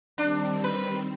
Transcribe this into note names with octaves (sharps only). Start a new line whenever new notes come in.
D#3 G3 C4 D4
B4